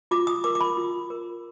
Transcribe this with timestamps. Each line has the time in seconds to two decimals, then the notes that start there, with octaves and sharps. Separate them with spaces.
0.11 F4 D6
0.27 D#6
0.44 A#4 D6
0.55 D6
0.61 B5
0.77 F4
1.10 A#4